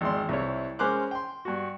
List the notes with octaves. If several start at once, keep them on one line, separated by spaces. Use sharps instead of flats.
G#1 E2 D5 C6
C2 C4 E4 C#5
G#3 C#4 A#4 C5 D6 F#6
G5 C6
G2 F#4